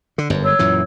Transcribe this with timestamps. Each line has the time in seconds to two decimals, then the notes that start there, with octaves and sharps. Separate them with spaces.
0.18 D3
0.30 G1 F#2
0.44 C#5 E6
0.59 F#2 A#2 E3